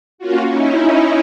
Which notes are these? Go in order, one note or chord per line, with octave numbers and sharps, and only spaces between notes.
A#3 C#4 F4 F#4
C#4 D#4 E4